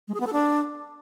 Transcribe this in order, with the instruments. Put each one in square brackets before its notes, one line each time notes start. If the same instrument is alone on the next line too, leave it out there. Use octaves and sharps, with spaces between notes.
[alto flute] G#3
G#4
B3
A4
D4